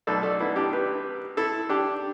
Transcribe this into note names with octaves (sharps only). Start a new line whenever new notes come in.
B1 B2 A3 A4 D5
A4 D5
B3 E4
D4 G4
G4 B4
E4 A4
D4 G4